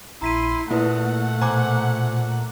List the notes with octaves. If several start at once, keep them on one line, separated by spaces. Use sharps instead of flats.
A#1 E4 A#5 C6 B6 D#7
A#2 A3 A#3 E4 B4 F#5
B2 C5 G#5 A#5 D6